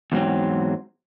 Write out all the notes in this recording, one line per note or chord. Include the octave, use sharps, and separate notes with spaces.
E2 G#2 F#3 C4